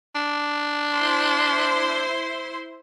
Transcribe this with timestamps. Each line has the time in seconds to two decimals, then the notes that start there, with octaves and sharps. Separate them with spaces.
0.15 D4
0.95 E4 C5 C6